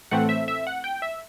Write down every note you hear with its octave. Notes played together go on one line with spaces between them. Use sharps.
A2 E3 A3 C4 F#5
E5
E5
F#5
G5
E5